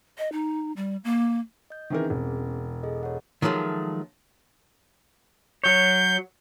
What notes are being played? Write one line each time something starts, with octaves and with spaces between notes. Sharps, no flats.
D#5
D#4
G3
A#3
D#5 G6
D#3 E3 C4 C#4 G#4 A#4
E1
G#4 A4 D#5
C#5 F#5
D#3 F3 F#3 G#3 A3
F#3 C#5 G6